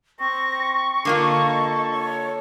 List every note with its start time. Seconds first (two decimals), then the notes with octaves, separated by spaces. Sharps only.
0.19 C4 C#6 A#6
1.05 D3 A#3 F4 A4 D#5
1.92 C#5